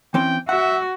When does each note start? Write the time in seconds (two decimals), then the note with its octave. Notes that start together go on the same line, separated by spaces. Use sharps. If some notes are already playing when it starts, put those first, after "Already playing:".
0.14 E3 C4 C#4 G5
0.49 F#4 E5 F#5